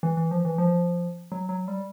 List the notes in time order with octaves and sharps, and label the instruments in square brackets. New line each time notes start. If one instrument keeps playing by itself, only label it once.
[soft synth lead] E3
E3
F3
E3
F3
F#3
F#3
G3